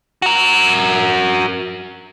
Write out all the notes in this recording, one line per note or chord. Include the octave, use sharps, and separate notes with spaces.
F#4 A#4